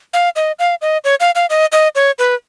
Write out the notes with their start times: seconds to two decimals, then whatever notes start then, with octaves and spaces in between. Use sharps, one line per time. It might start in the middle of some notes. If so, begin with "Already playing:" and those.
0.13 F5
0.36 D#5
0.59 F5
0.82 D#5
1.04 C#5
1.20 F5
1.35 F5
1.50 D#5
1.72 D#5
1.95 C#5
2.19 B4